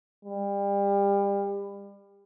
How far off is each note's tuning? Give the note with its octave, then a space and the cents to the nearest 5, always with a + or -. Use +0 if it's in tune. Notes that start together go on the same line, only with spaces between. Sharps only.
G3 +30